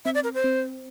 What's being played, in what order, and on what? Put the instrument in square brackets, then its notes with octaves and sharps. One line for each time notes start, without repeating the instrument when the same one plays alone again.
[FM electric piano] C4 [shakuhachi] E5
[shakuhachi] D5
A#4
C5
[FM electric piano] C4